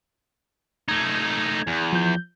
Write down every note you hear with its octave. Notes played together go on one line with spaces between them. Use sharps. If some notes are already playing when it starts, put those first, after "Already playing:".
A3 D#4 G#6
E2
F3 G6